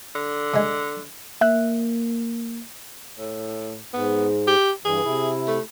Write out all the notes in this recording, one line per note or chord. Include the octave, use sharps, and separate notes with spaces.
D3
C3 G#3
A#3 E5 F#6
A2
G#2 B3
G4
G2 E3 G#4
C3 E4
A3